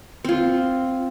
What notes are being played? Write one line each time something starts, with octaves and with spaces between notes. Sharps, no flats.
C4 F4